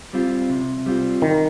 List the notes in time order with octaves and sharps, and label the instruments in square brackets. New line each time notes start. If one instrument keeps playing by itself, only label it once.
[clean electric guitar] G3 C4 F4
C3
G3 C4 F4
[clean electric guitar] C2 [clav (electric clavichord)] D#3